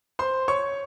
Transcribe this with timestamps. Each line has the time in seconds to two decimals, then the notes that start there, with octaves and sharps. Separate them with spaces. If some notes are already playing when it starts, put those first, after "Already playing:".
0.19 C5 C6
0.48 C#5 C#6